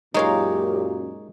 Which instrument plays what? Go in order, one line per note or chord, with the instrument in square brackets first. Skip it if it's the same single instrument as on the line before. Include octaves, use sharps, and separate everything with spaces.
[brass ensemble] F#2 A#2 [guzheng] G#3 A#4 F5 [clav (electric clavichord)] D#4 C#5 [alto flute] G4